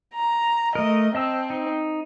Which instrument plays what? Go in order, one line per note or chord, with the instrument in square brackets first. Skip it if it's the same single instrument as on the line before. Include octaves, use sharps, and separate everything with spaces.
[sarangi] A#5
[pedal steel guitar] A3 A#4 [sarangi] D#5
[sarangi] C4 [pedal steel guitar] D#5 A5 E6
[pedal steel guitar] D#4